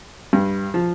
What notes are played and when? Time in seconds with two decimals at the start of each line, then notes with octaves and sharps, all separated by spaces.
0.33 G2
0.74 F3